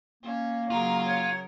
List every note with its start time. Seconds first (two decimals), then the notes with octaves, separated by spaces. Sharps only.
0.23 A#3 C#4
0.70 C#3 F#3 F4 A#4 A#5 C#6
1.04 C#5